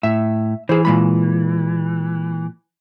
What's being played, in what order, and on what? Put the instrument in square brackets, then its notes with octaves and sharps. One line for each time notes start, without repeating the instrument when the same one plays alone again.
[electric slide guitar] A2 [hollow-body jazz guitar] E5
[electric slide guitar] E3 [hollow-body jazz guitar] G#4 C5
[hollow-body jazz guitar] A#2 G#3 B5